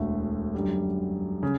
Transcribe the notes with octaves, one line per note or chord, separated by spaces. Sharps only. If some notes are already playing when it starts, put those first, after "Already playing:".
Already playing: E1 D2 D3 A3
F#2 D3 G3
C#3